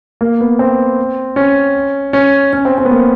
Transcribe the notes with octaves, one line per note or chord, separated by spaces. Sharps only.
A#3
B3
C4
C#4
C#4
C#4
C4
C4
B3
A#3